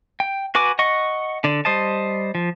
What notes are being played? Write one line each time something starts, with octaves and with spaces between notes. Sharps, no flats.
G5
F#4 B4 G#5 D6
D#5 F#5 C#6
D3 D5
G3 C5 D#5 A5
F3